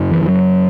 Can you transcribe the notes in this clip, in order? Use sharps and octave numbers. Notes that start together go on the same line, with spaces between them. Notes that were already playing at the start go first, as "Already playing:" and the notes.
Already playing: F#2 C#3
E3
E3
F#3